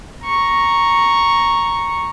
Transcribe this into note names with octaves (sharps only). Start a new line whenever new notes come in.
A#5 C#6